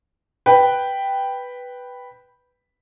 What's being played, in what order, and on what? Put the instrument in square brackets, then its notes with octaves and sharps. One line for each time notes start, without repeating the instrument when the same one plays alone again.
[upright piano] B4 G5